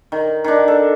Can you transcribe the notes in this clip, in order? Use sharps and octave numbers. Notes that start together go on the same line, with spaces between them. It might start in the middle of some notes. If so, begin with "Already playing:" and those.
D#3
D#3 D4
A4